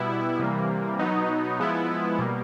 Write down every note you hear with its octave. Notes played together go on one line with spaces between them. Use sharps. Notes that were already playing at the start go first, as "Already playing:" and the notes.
Already playing: B2 G3 B3 E4
C3 E3 G3 A#3
B2 F#3 B3 D#4
F3 G#3 B3 E4
B2 G3 A#3